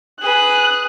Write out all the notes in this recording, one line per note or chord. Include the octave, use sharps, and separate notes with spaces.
G#4 B4 D#6 F#6